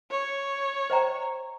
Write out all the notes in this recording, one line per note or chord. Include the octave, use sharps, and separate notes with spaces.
C#5
C5 D#5 G5 A#5